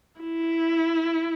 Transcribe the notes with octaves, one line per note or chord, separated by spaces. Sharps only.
E4